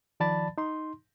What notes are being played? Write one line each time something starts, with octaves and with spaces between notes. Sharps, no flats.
D#3 F3 D5 A5 B5 A6
D#4 C6